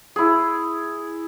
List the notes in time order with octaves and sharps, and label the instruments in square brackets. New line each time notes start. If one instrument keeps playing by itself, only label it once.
[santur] E4 G#4